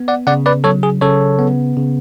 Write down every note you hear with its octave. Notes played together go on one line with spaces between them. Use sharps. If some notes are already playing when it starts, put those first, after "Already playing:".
Already playing: B3
D5 F#5
C#3 D5 F#5
B4 D5
F#3 A4 C#5
G#4
C#3 A4 C#5
B3
C#3